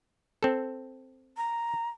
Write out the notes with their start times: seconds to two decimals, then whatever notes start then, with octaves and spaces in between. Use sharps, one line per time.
0.43 C4 A4
1.37 A#5